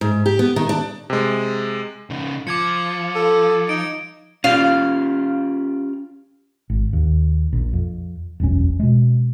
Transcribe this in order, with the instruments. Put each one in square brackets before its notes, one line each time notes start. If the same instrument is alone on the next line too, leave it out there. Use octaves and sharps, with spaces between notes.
[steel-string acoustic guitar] G#2
G4
B3
D#3
D4
[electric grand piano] C3 G#3
[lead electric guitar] C#3 D#4
[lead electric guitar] F3 [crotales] D6 G#6 C#7
[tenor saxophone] A4
[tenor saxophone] D#4 [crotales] D7
[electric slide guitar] C#4 F4 G4 [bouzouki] F5
[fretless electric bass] G#1
D#2
A#1
F2
E1 A#1 F#2 C#4
B2 G#3